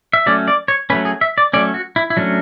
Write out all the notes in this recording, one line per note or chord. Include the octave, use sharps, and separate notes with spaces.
E5
F#3 A3 C#4 D5
D5
C#5
F#3 A3 C#4 B4
G#4
E5
D5
F#3 A3 C#4 D5
F#4
E4
E4
F#3 A3 C#4 D4